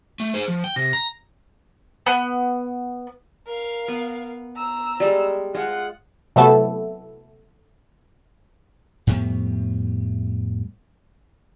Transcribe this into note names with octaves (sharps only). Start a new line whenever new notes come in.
A3
G#4 C5
F3
G5
C3 A#6
A#5
B3
A#4 F5
B3
A#5 E6
G3 G#3
G#3 F4 F#5 F#6
C3 F#3 A3 B3 E4 A4
F2 A2 G3 B3